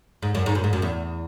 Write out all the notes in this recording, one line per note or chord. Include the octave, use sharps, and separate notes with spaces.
G#2
F#2
G#2
F#2
G#2
F#2
E2